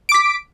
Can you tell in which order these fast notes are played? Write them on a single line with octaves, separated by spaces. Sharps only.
D7 D6 B6